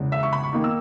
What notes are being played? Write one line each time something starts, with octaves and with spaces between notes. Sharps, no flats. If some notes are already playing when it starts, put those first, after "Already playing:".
Already playing: E2 C#3 G#3
E5
C#6
B5
C#6
D#3 A#3 D#4
E6